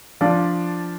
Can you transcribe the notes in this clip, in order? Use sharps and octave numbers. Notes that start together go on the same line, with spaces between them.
F3 D4